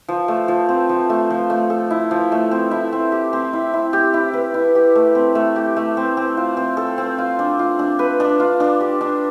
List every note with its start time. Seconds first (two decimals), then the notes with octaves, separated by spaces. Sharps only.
0.08 F3
0.28 A3
0.48 F3
0.69 C4
0.89 F3
1.09 A3
1.30 F3
1.50 A3
1.70 A4
1.91 E4
2.11 F3
2.32 A3
2.51 C4
2.71 E4
2.92 C4
3.12 G4
3.33 C4
3.53 E4
3.74 E4
3.93 G4
4.14 E4
4.34 B4
4.54 E4
4.75 G4
4.95 A3
5.15 C4
5.35 A3
5.56 G4
5.76 A3
5.97 C4
6.17 C4
6.37 F4
6.57 C4
6.77 A4
6.98 C4
7.18 F4
7.39 D4
7.59 F4
7.79 D4
7.99 B4
8.20 D4
8.40 F4
8.60 D4
8.80 G4
9.01 D4